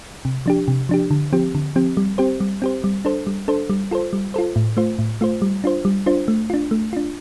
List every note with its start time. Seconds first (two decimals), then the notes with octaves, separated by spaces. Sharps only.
0.25 C3
0.46 F3 D4 G4
0.68 C3
0.89 F3 D4 G4
1.11 D3
1.33 F3 C4 G4
1.55 D3
1.76 F3 C4 G4
1.97 G3
2.18 C4 G4 C5
2.40 G3
2.62 C4 G4 C5
2.84 G3
3.05 D4 A4 C5
3.27 G3
3.48 D4 A4 C5
3.70 G3
3.91 F4 A4 C5
4.13 G3
4.34 F4 A4 C5
4.56 A2
4.77 A3 F4 C5
4.99 A2
5.21 A3 F4 C5
5.42 G3
5.64 D4 F4 C5
5.85 G3
6.06 D4 F4 C5
6.28 A3
6.50 D4 F4
6.71 A3
6.93 D4 F4